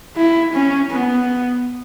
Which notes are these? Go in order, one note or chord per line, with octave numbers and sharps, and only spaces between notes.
E4
C#4
B3